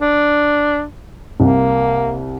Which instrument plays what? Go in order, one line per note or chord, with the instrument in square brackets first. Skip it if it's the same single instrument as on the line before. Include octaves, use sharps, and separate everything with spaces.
[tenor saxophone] D4
[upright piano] C2 [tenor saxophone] A#3